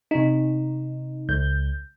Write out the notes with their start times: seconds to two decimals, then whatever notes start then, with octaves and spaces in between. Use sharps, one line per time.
0.11 C3 D#4
1.29 C#2 G6